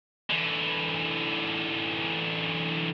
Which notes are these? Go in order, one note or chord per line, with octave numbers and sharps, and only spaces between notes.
D3 E3